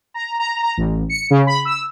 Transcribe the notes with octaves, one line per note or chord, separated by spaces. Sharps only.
A#5
A#5
A#5
A1
C#7
C#3
B5
E6